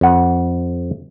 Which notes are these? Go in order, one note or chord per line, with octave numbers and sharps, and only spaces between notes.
F2 F#5